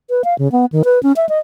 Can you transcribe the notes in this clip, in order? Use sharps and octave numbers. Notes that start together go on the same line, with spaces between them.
B4
F5
C#3
B3
D#3
B4
C#4
E5
D#5